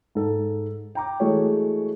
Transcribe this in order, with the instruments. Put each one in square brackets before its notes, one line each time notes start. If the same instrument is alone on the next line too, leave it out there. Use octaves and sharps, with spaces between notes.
[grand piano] G#2 A4
G5 A#5 D6
E3 G#3 A3 F#4 C#5